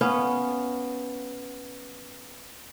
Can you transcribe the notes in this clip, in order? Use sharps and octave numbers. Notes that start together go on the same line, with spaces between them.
B3 C#4 F5